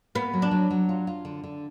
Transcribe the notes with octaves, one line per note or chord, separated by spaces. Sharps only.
A#3 B3
F#3
D4
F#3
F#3
F4
F4
D3
D3